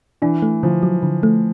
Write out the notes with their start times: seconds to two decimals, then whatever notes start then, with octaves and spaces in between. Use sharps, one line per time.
0.22 E3 D4
0.42 A3
0.63 D3 F3
0.83 F#3
1.03 D3
1.23 A3